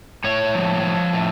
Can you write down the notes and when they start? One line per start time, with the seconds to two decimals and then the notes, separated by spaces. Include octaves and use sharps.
0.24 A2 C#5
0.54 F3
0.83 F3
1.13 A2